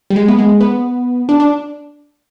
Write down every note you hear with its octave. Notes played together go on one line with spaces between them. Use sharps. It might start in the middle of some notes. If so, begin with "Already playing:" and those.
G3
G#3
B3
G#3
B3
D4
D4